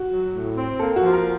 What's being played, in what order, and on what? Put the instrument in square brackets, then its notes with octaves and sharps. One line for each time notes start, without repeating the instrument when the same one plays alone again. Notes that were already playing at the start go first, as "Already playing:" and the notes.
Already playing: [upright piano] F#4
[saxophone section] F#3
A2
C4
[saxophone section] A#3 [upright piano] A4
[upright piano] F#4
[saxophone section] F3
[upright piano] A#4